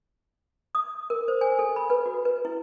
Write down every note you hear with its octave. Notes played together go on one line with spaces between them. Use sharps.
D#6
A#4
C5
G#5
A4
B5
B4
F#4
B4
E4